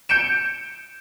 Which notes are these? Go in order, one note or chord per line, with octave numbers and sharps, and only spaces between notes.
G6 C#7 D7 E7